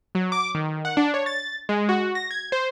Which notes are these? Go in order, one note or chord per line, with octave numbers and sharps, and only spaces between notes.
F#3
D6
D#3
F#5
D4
C#5
A6
G#3
F#4
A#6
G#6
C5